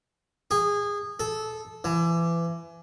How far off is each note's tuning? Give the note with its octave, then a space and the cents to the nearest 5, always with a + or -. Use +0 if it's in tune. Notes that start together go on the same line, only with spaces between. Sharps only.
G#4 -20
A4 -20
E3 +30